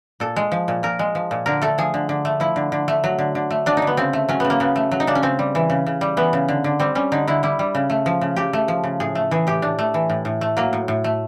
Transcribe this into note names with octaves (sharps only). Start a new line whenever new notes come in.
A#2 A4
G#3
F3
A#2
A#2 A#4
G#3
F3
A#2
D3 A#4
A3 A4
F3 G#4
D3
D3
A3
F3 E4
D3
D3
A3
F#3
D3
D3
A3
F#3 D4
D#4
D3
B3
C#3 C4
A3
F#3 C#4
C#3 B3
A#3
C#3 B3
A3
F#3
D#4
C#3 D4
C#4
C#3 C4
G3
E3
C#3
C#3
G3
E3 B3
C#3
D3
D3
G3 C4
G3 C#4
D3 D#4
D3 E4
G3 E4
G3
C#3
A3
F3
C#3
C#3 G4
A3
F3
C#3
A2 G#4
A3
E3 G#4
A2 G4
A2 D4
A3
E3
A2
A2
A3
F#3 A#3
A2
A2
A3